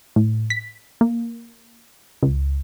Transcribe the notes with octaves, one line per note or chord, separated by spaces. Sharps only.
A2
B6
A#3
C#2